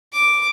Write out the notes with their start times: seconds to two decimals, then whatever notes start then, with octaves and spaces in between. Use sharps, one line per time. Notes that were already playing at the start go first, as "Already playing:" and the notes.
0.13 D6